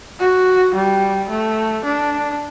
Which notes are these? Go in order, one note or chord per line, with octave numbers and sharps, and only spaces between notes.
F#4
G3
A3
D4